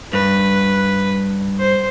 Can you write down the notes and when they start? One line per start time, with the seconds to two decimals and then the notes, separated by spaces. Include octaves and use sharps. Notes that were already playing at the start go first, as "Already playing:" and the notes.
0.13 G2 B4
1.59 C5